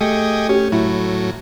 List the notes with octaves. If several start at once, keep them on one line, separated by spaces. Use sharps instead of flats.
A3 G4 G#4 D#5
C#4 G4
A2 F#3 E4